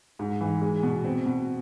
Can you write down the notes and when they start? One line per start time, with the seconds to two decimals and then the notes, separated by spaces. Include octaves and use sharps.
0.19 G#2
0.41 E3
0.62 G#3
0.83 B2
1.05 C4
1.26 B2